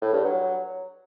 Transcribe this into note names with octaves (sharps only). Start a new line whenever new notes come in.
A2
G2
F#3